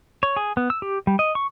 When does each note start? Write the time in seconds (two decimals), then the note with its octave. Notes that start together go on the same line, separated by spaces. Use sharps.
0.23 C#5
0.37 G#4
0.57 B3
0.70 E6
0.82 G4
1.07 G3
1.19 D#5
1.35 C#6